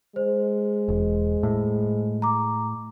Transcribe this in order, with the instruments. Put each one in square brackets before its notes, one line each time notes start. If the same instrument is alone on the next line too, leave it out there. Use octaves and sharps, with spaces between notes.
[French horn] G#3 [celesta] C5
[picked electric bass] E1
A2
[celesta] A#5 D6